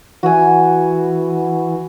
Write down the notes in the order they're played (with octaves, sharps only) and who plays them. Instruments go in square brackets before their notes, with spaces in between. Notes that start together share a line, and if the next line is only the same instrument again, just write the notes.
[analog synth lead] E3 [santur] F#4 G#5